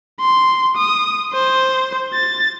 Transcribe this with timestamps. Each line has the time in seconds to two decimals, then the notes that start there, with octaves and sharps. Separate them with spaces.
0.20 C6
0.77 D#6
1.33 C5
2.13 A6